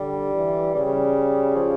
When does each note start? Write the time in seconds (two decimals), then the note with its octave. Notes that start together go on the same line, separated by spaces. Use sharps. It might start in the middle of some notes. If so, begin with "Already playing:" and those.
Already playing: D3 G3
0.34 E3
0.75 C#3 G3
1.56 F3